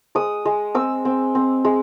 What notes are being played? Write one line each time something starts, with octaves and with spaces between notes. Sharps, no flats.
G#3 D#6
G#3
C4 E6
C4
C4
G#3